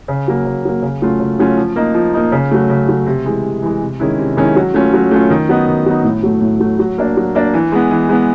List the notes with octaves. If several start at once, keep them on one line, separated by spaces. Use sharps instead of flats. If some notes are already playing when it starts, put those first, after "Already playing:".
C#3
F#3 A#3
C#3
F#3 A#3
C#3
F#3 A3 C#4 F4
C#3
F#3 A3 C#4 F4
F3
A#3 D#4
F3
A#3 D#4
C#3
F#3 A3
C#3
F#3 A3
C3
E3 G#3
C3
E3 G#3
C3
D#3 G#3 C#4 E4
C3
D#3 G#3 C#4 E4
F#3
A3 C#4 F4
F#3
A3 C#4 F4
D#3
F#3 B3 D#4
D#3
F#3 B3 D#4
A2
F#3 A3
A2
F#3 A3
F#3
A#3 D4
F#3
A#3 D4
E3
G#3 B3
E3
G#3 B3